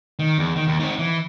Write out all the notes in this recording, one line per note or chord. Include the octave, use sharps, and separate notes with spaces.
D#3
E2
D#3
D#2
C4 D#4
E3